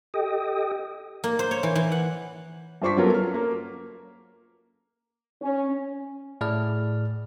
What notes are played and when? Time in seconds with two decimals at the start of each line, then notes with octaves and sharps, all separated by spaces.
0.14 G4 A4 D#5 G5 D#6
1.24 A#3
1.39 C5
1.51 C#5
1.63 E3
1.75 E3
1.92 F#5
2.82 G2 F4 C5 C#6 D6 B6
2.97 F#3 B3 C#4 F4 A4 A#4
3.14 F6
3.34 A#3
5.42 C#4
6.41 A2 G#4 D5 F6